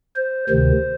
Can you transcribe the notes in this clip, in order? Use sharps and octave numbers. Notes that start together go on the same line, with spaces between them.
C5
D2 C3 D#3 C5